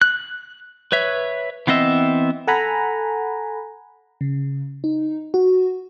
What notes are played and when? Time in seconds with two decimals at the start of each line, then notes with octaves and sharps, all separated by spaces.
0.02 F#6
0.92 B4 C#5 E5
1.67 E3 B3 C4 D#5 E5
2.47 A4 F#5 G#5 A#5 B5
4.21 C#3
4.84 D#4
5.34 F#4